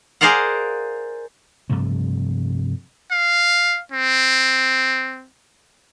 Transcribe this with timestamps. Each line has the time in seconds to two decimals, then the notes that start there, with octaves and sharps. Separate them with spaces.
0.21 G#4 A#4 C5 D5 F5 F#5
1.70 G2 C3 F3 A3
3.11 F5
3.92 C4